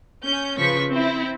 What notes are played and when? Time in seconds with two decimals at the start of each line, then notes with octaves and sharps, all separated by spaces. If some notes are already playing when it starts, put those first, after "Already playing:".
0.23 C#4 G6
0.58 C#3 F3 B4 C#6 B6
0.91 C4 E4